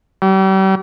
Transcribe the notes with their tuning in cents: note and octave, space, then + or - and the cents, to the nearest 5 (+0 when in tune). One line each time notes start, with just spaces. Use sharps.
G3 -40